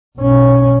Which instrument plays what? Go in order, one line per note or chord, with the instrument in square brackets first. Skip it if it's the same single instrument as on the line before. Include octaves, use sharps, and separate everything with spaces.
[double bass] B1 C#4